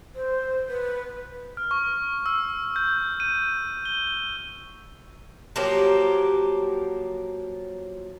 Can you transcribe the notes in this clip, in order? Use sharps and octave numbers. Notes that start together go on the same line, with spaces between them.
C5
B4
F6
C#6
E6
G6
D#7
G7
F3 F#3 A#3 G4